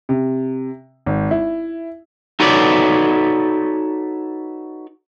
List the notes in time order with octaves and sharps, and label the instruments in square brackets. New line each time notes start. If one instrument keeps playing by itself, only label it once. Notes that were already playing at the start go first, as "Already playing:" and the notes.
[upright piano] C3
G#1
E4
[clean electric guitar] D#4 F#4 A4 B4 C#5 D5